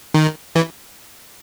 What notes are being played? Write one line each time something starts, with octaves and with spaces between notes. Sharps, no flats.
D#3
E3